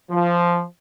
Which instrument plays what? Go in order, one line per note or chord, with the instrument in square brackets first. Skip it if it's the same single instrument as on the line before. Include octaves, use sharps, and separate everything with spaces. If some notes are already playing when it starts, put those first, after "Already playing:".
[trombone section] F3